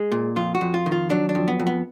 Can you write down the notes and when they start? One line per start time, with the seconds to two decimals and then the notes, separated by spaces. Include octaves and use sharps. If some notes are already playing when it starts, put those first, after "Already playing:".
Already playing: G#3
0.12 A#2
0.36 F2 F4
0.55 F#4
0.61 F2
0.74 F4
0.86 D#3
0.92 F4
1.10 F#3 D4
1.29 D4
1.35 F2
1.48 B3
1.59 F2
1.67 B3